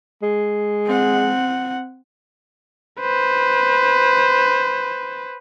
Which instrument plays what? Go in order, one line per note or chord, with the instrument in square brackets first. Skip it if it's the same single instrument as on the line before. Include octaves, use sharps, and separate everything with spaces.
[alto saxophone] G#3
[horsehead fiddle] C4 F#5
[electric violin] B4 C5